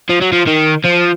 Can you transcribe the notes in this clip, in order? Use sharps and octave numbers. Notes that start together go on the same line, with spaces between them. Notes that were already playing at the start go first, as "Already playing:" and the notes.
F3
F#3
F3
D#3
F3